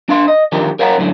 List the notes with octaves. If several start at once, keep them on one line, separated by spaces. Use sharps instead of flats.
D4 F5 C6
D#5
D3 D#3 F3 G4 A#4
A#4 C#5 F5 F#5 A5 A#5
F#2 A2 D3